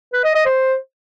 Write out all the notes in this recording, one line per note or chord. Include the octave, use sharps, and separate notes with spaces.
B4
D#5
D#5
C5